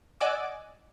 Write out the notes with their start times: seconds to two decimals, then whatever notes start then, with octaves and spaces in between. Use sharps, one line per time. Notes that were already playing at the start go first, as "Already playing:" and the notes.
0.20 D5 D#5 F#5 G#5 D6 E6